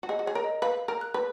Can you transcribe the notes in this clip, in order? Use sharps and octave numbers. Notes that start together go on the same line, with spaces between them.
F#4
G#4 D#5
F#4
G#4 C#5
A#4
D#5
B4 F5
A#4 F6
F#6
B4 F#6